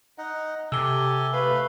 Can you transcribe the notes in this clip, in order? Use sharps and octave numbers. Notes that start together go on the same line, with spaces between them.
D#4 D#5 F#5
C3 G4 A4 G#5 E6 G7
A3 B4 F5